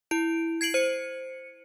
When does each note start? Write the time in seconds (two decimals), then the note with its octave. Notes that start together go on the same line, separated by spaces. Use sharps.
0.11 E4 D7
0.61 G#6 C7 D7 F#7
0.74 C5 C#7